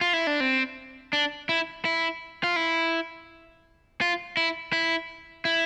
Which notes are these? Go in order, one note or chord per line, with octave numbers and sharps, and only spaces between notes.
F4
E4
D4
C4
D4
E4
E4
F4
E4
F4
E4
E4
E4